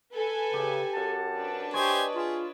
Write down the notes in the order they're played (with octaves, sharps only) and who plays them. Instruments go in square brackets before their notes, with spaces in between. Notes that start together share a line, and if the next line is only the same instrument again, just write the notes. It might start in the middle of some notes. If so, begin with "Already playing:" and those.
[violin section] A4 B4 G#5
[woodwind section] C#3 [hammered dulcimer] G4
[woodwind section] F#2 F#5 A5
[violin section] D4 B4
[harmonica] G4 C5 G#5 [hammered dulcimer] C#5 D#5
[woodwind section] F4 [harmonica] G#4